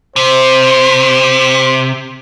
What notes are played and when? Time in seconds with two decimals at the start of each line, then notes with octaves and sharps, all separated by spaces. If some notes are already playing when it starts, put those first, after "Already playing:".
0.16 C3 C5